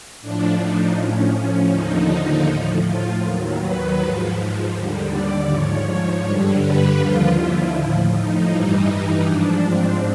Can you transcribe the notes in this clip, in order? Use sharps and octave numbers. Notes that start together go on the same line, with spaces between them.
A2 F3 D4
D#4
A2 F3 C#4
C#4
D#2 D3 F3 D#4
A2 F3
F4
D#2 D#3 F#3
B4
G#2 F3
D#2 D3 G3
D5
G#2 F3 C#5
G2 D3 G3
B4
D#2 D3 F3 F4
E4
A2 F3
D#4
G2 E3 G3 D#4
G#2 F3 D4
C4